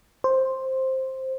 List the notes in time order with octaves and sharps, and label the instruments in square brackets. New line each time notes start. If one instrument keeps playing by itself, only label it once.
[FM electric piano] C5